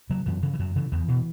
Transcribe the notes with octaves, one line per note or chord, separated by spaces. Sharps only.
C#3 F#3
F#2 E3
C#3 E3
E3
F#2 F#3
C#3 E3
E2 E3
B2